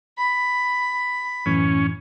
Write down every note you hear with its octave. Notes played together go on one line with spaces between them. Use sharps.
B5
F#2 A2 E3 C#4